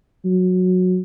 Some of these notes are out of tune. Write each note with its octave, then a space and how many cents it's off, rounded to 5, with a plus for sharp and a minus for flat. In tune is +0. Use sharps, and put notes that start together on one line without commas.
F#3 -15